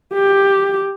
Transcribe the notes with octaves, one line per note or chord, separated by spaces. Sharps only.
G4